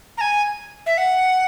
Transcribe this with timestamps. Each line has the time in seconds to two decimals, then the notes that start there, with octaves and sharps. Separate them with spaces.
0.18 A#5
0.21 G#5
0.86 E5
0.98 F#5